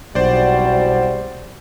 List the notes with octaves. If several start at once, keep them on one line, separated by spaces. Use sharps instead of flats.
B1 E2 C3 G3 F#4 C5 D5